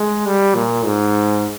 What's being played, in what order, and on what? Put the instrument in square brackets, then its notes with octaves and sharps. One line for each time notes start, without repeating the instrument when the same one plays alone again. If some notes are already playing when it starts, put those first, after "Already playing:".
Already playing: [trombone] G#3
G3
A#2
G#2